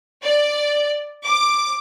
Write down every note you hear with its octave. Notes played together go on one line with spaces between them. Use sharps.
D5
D6